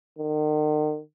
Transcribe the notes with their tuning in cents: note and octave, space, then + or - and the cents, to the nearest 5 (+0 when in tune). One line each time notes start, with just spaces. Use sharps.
D#3 -40